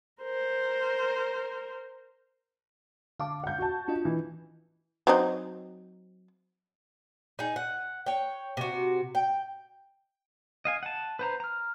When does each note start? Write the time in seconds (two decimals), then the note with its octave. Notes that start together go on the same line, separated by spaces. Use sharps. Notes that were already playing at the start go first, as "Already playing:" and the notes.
0.22 A#4 C5
3.20 D3 F5 A5 D6
3.44 F#5 G6
3.58 F#4 A5
3.88 D4 F4 D#5
4.05 E3
5.07 F#3 C4 D#4
7.39 D#4 G#4
7.56 F#5
8.06 C#5 G5
8.57 C3 F#4
9.15 G5
10.65 D#5 F5 G#5
10.83 F#5 A5
11.19 B4 C5 A#5
11.40 A#5 F6